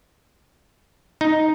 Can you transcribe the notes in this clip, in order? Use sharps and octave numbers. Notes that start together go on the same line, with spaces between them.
D#4